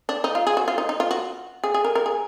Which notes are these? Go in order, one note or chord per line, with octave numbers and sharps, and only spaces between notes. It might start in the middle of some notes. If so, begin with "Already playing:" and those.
D4
D#4
F4
G#4
F#4
F4
D#4
D#4
F4
F#4
G#4
G#4
A#4
A#4
G#4